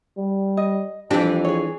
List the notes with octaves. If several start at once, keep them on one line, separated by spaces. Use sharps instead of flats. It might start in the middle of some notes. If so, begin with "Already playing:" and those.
G3
D#5
F2 E3 D4 G4 G5
G#4 C#5